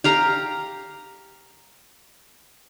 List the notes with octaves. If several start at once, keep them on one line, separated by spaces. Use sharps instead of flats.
G4 F5 A#5